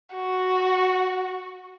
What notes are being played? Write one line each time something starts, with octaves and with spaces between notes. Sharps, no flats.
F#4